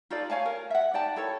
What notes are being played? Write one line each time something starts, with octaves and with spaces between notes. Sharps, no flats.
D#4 F4 A4 D5
C#5 F5 G#5 A5
A#4
E5 F#5
D#4 D5 G5 A5
E4 A4 A#4 C#5